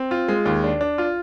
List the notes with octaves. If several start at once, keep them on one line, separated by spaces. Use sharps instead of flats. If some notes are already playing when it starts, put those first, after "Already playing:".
Already playing: C4
F4
G#3
D#2
D4
D4
F4